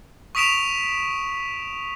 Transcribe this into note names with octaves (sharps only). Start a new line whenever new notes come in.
C#6 D#6 B6 D7 E7 F7